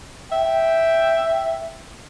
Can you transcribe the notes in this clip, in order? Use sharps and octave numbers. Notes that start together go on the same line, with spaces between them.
E5 G5